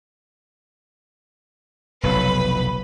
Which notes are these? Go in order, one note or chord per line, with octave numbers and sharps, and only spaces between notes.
F1 B1 B4 B5